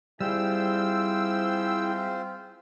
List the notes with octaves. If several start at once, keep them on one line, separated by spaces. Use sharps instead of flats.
G3 C4 E4 F4 G#4 C5 G5 E6